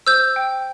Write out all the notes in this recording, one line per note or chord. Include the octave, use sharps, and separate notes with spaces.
C5 E6 G6
G5